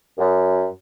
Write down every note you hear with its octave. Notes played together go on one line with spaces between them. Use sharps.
F#2